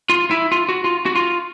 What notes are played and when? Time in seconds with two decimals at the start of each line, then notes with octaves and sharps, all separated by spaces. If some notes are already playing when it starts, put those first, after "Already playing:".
0.10 F4
0.31 E4
0.52 F4
0.69 F#4
0.84 F4
1.06 F#4
1.15 F4